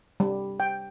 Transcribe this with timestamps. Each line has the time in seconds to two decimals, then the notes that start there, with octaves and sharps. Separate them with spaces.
0.20 G3
0.60 G5